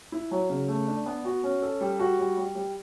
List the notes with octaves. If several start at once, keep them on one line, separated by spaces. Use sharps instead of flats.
E4
F#3
C#3
A3
D4
B3
F#4
C#4
A4
G3
F#4
G3
G3
G3